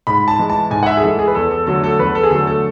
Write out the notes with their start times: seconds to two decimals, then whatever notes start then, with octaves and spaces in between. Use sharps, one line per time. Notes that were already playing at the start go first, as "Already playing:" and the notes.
0.07 G#2 B5
0.28 A5
0.39 E3 G#3
0.50 A5
0.70 G#2 G#5
0.83 F#5
0.86 E5
0.97 G#4
1.03 E3 G#3 A4
1.19 G#4
1.28 B4
1.35 E2 A4
1.51 A4
1.67 D3 F#3 A3 A4
1.84 A4
1.99 E2 B4
2.15 A4
2.23 G#4
2.31 D3 F#3 A3 A4
2.47 A4